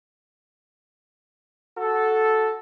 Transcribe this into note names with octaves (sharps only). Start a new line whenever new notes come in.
F#4 A4